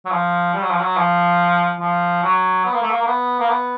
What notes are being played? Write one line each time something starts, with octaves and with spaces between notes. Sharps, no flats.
F#3
F3
G3
F#3
F3
F#3
F3
F3
F#3
B3
A#3
A3
A#3
A#3
B3
A#3
B3